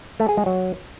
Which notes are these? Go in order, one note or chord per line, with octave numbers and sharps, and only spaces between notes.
A3
G#4
G#3
F#3